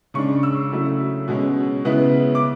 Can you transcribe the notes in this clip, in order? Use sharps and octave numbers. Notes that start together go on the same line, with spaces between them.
C#3 G#3 D4 C#6
E6
C#3 F#3 A3 E4
B2 G#3 C#4
C#3 G#3 B3 E4
D6